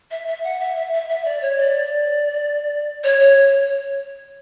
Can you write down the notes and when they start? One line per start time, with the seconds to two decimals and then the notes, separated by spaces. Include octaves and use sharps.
0.11 E5
0.27 E5
0.43 F#5
0.60 E5
0.76 E5
0.92 E5
1.09 E5
1.25 D5
1.41 C#5
1.57 D5
3.04 C#5
3.20 C#5